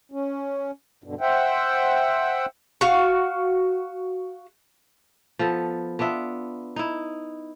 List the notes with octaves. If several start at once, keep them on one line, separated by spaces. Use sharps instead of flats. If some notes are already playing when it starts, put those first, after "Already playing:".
C#4
G2 B2 D3
C5 E5 F#5 G5
F#4 F5
F3 B3 A4
B3 D4 F4 E5
D#4 E4